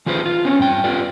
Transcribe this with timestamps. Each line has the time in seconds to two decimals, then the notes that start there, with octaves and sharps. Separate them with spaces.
0.06 E3 F4 G#4 B4 C5
0.26 F4
0.45 C4 C#4 C#5
0.60 G2 G5
0.84 F4 G4 B4 D5